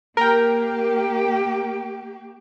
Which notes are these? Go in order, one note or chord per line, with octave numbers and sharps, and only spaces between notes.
A#3 G4 A#4 G5